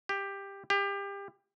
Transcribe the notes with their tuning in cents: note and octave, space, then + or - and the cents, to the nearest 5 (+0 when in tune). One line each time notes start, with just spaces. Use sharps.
G4 +10
G4 +25